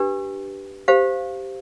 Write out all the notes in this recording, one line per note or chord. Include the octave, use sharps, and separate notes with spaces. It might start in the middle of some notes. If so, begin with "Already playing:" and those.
Already playing: D4 G4 B4
G4 C5 F5